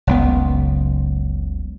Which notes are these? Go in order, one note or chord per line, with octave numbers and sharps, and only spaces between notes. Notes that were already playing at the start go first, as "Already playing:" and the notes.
F#1 C#2 B3